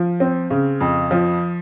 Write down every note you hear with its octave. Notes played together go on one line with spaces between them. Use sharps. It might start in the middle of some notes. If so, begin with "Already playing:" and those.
Already playing: F3
C4
C#3
F2
F3